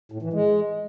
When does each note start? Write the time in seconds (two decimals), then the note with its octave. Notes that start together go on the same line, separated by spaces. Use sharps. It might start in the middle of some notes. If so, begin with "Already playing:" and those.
0.12 A2
0.22 E3
0.33 G#3